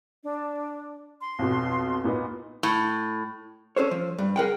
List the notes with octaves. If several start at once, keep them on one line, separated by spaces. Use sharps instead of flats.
D4
C6
B1 F2 B2
A#2 B3 D#4
A2
C#4 A4 C5 C#5
F3
G2
G#4 A#4 F#5 G5